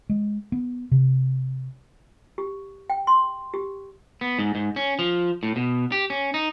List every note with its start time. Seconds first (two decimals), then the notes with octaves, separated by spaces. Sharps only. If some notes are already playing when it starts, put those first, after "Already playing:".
0.09 G#3
0.52 B3
0.91 C3
2.38 G4
2.90 G5
3.07 C6
3.54 G4
4.21 B3
4.39 G#2
4.55 G#2
4.76 C#4
4.99 F3
5.43 A2
5.56 B2
5.92 G4
6.10 C#4
6.34 D#4